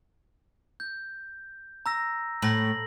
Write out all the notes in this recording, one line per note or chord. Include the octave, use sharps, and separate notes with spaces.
G6
A#5 E6 A#6
A2 A#6 F#7